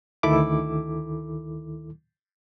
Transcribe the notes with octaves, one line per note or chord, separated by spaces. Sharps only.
D2 D#3 E4 A4 D6